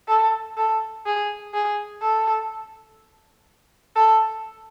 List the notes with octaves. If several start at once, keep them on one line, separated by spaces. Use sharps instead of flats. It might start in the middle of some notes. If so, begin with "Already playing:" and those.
A4
A4
G#4
G#4
A4
A4